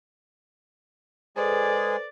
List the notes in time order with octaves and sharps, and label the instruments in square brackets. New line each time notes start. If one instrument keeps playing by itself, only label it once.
[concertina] G#3 G#4 [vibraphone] A4 B4 C5 [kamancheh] D5